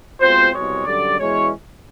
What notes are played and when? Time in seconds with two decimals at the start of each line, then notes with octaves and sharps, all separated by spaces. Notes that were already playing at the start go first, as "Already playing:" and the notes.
0.20 B2 G#3 C4 F4 C5
0.52 C2 B2 G#3 C#5
0.85 F#2 D3 G3 D5
1.18 E2 B2 G#3 C#4 E4 C#5